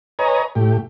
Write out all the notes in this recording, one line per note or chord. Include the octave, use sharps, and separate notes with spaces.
B4 C#5 D#5 G#5 A#5
A2 G4